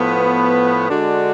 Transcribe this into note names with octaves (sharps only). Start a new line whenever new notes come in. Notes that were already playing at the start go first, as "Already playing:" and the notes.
Already playing: A2 F3 B3
D3 G#3 D4 F#4